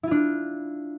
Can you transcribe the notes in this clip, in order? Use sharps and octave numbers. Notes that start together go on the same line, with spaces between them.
D4 E4 F4